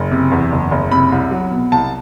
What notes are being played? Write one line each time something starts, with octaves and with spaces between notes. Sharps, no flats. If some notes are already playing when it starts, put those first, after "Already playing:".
Already playing: F#1
C3
E2
F#1
F#1
C3 B5
C2
F#3
B2
C2 A5